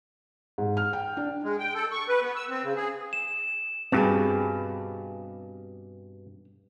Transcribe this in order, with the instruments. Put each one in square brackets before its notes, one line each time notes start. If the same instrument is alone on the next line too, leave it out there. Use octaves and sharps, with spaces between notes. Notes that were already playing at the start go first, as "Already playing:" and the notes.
[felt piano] G#2
F6
G5
D4
[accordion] G#3
G5
A4
C#6
B4
B3
E6
C4
C#3
G#4
[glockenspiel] E7
[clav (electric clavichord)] G2 B2 [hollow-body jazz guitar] C4 G4 G#4